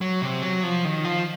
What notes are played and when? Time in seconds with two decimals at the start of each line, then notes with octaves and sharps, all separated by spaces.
0.01 F#3
0.22 C3
0.42 F#3
0.63 F3
0.85 D#3
1.05 F3